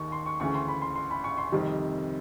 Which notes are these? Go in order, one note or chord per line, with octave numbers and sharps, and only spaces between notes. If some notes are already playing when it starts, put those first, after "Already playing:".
Already playing: D#2 D#3 C#6
C6
C#6
D2 C#3 E3 C#6
C6
B5
C6
C6
B5
C#6
C6
F2 C3 D#3 G3